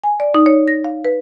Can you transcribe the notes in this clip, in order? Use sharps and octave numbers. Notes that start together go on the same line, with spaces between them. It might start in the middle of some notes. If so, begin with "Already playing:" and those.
G#5
D5
D#4
C#5
A#6
F5
B4